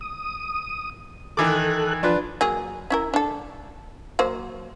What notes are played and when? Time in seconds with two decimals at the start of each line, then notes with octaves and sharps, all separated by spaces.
0.01 D#6
1.37 D#3 E3 A4 D6 F#6
2.03 F3 D4 F4 B4
2.41 F#3 A#3 G#4
2.90 C#4 E4 A#4
3.14 D4 A4
4.19 F#3 A#3 C5